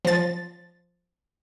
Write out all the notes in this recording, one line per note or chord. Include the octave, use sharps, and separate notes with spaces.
F3 A6